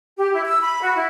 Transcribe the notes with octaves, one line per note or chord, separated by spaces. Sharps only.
G4
E4
E6
B5
F#4
E4